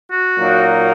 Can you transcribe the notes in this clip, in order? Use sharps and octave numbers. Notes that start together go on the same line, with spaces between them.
F#4
A#2 F#3 A#3 D#4